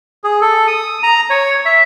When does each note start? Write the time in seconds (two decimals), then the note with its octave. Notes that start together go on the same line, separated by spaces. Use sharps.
0.24 G#4
0.41 A4
0.67 D#6
1.03 A#5
1.30 C#5
1.66 E5